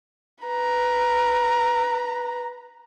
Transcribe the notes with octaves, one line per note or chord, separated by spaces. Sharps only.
B4 A#5